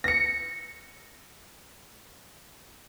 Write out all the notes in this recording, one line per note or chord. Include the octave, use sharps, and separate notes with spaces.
A#6 C#7